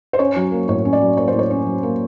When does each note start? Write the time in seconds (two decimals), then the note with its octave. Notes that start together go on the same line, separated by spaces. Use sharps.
0.13 C5
0.19 C#4 C#5
0.36 F#3
0.52 A#3
0.68 A2 C#5
0.85 C#4
0.93 D5
1.01 F#3
1.17 A#3 C#5
1.28 C5
1.34 A2 C#5
1.51 C#4
1.66 F#3
1.83 A#3